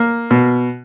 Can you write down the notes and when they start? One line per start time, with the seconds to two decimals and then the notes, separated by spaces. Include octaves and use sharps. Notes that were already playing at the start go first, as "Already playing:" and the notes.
Already playing: A#3
0.31 B2